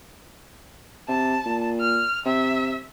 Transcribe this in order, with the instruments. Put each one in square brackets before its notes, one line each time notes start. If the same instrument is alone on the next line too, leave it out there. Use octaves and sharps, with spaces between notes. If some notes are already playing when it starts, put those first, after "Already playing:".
[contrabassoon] C3 [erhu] A5
[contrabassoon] A#2
[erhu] F6
[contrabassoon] C3 [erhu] E5